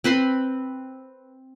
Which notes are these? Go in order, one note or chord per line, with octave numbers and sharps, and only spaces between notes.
C4 B4 B5 C6